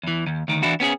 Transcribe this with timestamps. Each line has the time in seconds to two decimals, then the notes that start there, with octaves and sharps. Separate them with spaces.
0.03 E2 E3
0.27 D#2
0.48 D2 D#3
0.63 E3 D4 E4 F#4
0.80 B3 C#4 G4 G#4